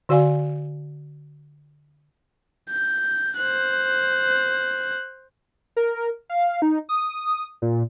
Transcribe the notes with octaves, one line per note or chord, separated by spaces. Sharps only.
D3 F#4 D5 F5 G#5
G6
C5 F#6
A#4
F5
D#4
D#6
A#2